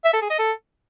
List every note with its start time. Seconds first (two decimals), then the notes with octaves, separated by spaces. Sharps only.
0.05 E5
0.13 A4
0.22 G#4
0.30 D#5
0.39 A4